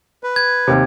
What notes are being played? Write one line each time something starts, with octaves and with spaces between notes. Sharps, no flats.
B4
G#6
D#2 C3